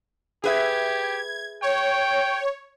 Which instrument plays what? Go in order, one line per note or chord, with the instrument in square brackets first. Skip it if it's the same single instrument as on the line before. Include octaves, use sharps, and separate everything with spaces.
[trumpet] G4 [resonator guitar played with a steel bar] G#4 B4 E5 [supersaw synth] G#6
[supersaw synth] C#5 [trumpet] G5